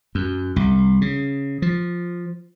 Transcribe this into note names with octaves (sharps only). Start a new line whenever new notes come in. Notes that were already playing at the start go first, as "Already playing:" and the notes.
F#2
C2
C#3
F3